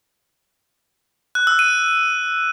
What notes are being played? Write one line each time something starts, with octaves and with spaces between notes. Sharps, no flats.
F#6
E6
D#7